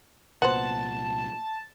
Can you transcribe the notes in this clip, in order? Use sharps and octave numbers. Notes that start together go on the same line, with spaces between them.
C2 A#2 B3 F#4 C5 F#5 A5